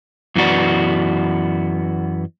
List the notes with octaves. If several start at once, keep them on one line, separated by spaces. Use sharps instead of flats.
F#2 E3 B3 F#4 D5